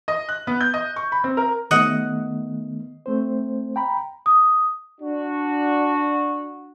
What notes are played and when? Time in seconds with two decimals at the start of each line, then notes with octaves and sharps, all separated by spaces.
0.08 D#5
0.29 F#6
0.47 B3
0.61 G6
0.74 D#5
0.96 C#6
1.12 B5
1.24 C4
1.37 A#4
1.71 D#3 A3 B3 D#5 F#5
3.06 A3 C4 C5
3.76 G5 A#5 B5
4.26 D#6
5.01 D4 F#4